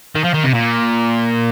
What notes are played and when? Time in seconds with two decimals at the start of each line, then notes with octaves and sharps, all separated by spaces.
0.15 D#3
0.24 F3
0.34 D#3
0.44 C3
0.55 A#2